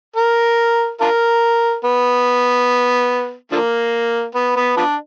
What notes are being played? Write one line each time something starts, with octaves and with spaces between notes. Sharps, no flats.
A#4
D4 F4 A#4
B3
D3 F3 A#3
B3
B3
F3 B3 D4